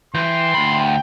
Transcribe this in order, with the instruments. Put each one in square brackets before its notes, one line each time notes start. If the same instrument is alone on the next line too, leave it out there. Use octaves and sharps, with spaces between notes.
[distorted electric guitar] E3 [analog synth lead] G5 [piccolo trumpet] C6
[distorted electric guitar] D2 B5